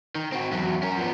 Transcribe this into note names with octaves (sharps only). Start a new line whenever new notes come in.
D#3
C4 F#4
E2 F#3
C#4 A#4
F3 B3